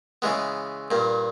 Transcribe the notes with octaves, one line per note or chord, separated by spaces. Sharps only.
C#3 E3 G#3 B3
G2 A#2